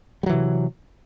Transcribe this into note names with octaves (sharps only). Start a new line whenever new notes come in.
C3 E3 F#3 G3